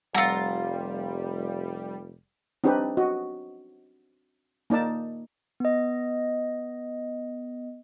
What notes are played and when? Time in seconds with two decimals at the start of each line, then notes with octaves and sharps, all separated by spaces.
0.14 F1 G3 F4 F#5 A#5 E6 C#7
2.64 C4 D4 D#4 G4 B4
2.97 F#4 D#5
4.70 A#3 D#4 D5 A5
5.60 B3 D#5